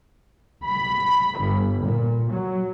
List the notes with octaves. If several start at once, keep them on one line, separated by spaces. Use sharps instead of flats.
B5
G1
A#2
F#3